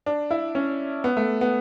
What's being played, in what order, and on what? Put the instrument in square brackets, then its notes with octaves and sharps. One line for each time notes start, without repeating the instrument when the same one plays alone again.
[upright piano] D4
E4
C#4
B3
A3
B3